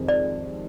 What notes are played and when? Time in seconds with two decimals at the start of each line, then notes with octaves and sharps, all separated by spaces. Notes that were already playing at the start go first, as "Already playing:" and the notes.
Already playing: F2 C3 D#3 G#3
0.09 D5